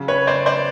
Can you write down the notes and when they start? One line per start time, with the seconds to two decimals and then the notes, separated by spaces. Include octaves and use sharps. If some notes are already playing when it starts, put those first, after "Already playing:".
Already playing: C#3 F#3
0.08 B4 C#5
0.27 C5 D5
0.46 C5 D5